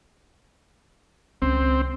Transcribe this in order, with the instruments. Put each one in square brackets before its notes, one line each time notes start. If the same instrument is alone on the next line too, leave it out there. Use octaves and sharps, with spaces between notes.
[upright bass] C#2 D#3 [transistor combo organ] C4